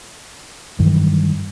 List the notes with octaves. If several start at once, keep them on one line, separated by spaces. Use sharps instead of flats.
G2 D#3 E3 F#3